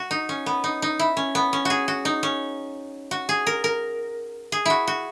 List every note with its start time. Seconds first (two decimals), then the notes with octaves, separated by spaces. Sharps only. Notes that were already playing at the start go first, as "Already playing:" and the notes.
Already playing: F#4
0.11 D#4
0.29 C#4
0.46 B3
0.64 D#4
0.82 D#4
0.99 E4
1.17 C#4
1.35 B3
1.53 C#4
1.65 F#4 G#4
1.88 F#4
2.05 D#4
2.23 C#4
3.11 F#4
3.29 G#4
3.47 A#4
3.64 A#4
4.52 G#4
4.66 E4 F#4
4.87 F#4